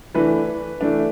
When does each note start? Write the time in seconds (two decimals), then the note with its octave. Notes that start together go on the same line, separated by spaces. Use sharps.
0.14 E3 A3 D4 B4
0.81 E3 A3 D4